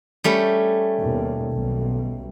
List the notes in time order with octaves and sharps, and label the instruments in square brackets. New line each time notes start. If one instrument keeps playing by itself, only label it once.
[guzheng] G3 A3 C#4
[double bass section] D#2 B2
B1 B2